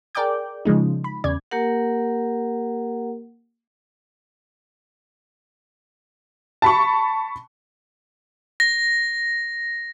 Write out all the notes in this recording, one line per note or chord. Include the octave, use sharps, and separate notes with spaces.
G#4 A#4 D5 G5 D6 G6
C#3 F3 G#3 D#4
B5
E2 C#3 D5 G#6
A#3 G4 A#4 F#5
A5 B5 C#6
A#6